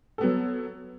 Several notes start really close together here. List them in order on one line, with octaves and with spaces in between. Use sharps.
A4 B3 F#3